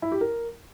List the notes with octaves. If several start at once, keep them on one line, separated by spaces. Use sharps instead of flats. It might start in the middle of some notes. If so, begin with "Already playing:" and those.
E4
G4
A#4